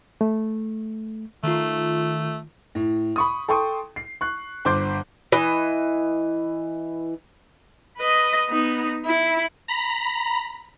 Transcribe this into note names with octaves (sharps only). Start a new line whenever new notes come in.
A3
D#3 A3 F4
A2
B5 C#6 D#6
A4 G5 C6 C#6 D#6
C7
C#6 F#6
G1 C5 C6 D6 G6
E3 D#5
B4 D#5
B3 D#4
E4
A#5 B5 B6